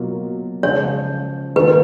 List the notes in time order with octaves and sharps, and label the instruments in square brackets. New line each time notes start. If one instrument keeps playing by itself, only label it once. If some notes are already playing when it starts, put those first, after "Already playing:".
Already playing: [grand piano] B2 F#3 A#3 F4
[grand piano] C#3 F3 G#3 C#4 F4 [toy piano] C#5
[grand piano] D#3 A#3 F4 A#4 [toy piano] B4